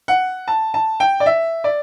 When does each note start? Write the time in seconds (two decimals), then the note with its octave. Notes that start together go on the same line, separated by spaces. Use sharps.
0.08 F#5
0.48 A5
0.74 A5
1.00 G5
1.20 D5
1.26 E5
1.64 D5